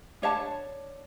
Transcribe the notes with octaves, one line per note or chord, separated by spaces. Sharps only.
D4 C#5 E5 A5